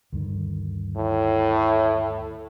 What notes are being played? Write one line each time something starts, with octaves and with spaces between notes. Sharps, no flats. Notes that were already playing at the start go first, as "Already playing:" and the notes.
D2 G2 D#3
A2